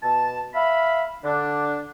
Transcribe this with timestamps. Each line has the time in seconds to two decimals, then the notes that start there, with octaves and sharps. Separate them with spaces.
0.03 B2 A5
0.55 E5 F5 B5
1.24 D3 D4